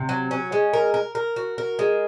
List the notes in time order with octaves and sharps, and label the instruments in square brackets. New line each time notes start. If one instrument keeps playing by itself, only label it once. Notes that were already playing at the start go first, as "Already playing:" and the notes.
Already playing: [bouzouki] C3
F#3
C#4
G#3
A#4
A#4
A#4
F#4
A#4
G#3